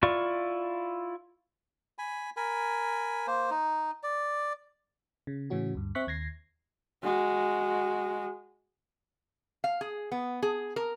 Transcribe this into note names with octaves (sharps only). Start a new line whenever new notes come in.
E4 F4 D5 C#6
G#5 B5
A#4 G#5 B5
A#3 C5
D#4
D5
C#3
A2 C#3 E3 C#4 F#4
D2 G2
C4 E5 C#6 F#6 B6
D#2 G#6 A#6 C7
G#3 F#4
F5
G#4
B3
G#4
A#4